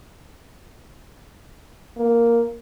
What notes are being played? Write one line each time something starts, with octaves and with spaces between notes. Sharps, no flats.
A#3